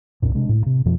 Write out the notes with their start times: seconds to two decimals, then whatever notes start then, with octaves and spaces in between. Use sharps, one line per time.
0.22 C2 F2 A#2
0.34 C3 G#3 D4
0.49 A2
0.66 C3
0.85 F2 B2 F3